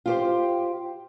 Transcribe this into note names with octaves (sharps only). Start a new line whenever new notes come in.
F4 G4 C5